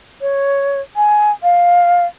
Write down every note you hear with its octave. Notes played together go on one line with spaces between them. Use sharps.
C#5
G#5
F5